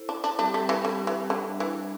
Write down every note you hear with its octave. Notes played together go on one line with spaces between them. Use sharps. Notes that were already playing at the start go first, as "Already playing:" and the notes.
Already playing: E4 A4 C5
D4
D4
G3 C4 D4 G4 E5
A3
E3
D3
E3
D3 G3 D4 C5 E5
E3